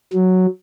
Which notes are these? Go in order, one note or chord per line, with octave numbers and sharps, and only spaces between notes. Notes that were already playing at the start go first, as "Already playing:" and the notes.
F#3